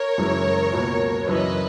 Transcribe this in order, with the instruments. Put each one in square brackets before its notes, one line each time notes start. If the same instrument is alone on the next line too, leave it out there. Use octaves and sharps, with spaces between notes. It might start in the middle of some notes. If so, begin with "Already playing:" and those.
Already playing: [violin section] A#4 C#5
[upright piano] F#1 F#2 E3 G#3
C#2 B2 A#3
[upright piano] F#1 F#2 E3 [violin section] B4 D#5